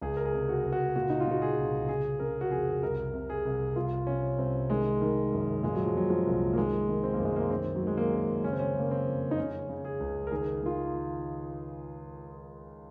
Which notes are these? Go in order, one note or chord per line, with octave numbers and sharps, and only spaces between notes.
C#2 G#4
A#4
G#4
C3
F#4
C#2
F#4
A#2 F#4
D#4
F4
A#2 F#4
G#4
C2
C#3 G#4
C#3 A#4
F#4
F2 G#4
C2 A#4
C3
G#4
C2
C2 F4
C3 C#4
C2 C4
D#3 G#3
D#3
F#2
A#2 G#3
F#3
F3
A#2 F#3
F3
C2
A#3
D#3 G#3
D#3
C4
F#2 A#3
G#3
A#3
D#3 C4
F#3
D#3
G#3
A#3
F#2
C#3 C#4
C4
C#4
C#3 A#3
C4
F2
D#4
C#3 C#4
C#3
G#4
C#2
A#4
D#3 G#4
D#3 F4